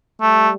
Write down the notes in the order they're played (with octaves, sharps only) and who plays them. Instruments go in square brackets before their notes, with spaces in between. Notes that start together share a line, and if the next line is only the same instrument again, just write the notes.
[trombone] G3 [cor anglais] A3